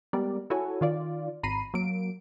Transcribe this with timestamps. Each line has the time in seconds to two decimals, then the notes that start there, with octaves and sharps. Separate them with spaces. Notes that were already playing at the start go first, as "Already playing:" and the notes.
0.13 G3 G#3 B3 A#4 D5
0.50 E4 F#4 A4 C#5 G#5
0.81 D#3 F4 D5
1.43 G#1 A#5 B5 C7 D#7
1.74 F#3 A#3 D7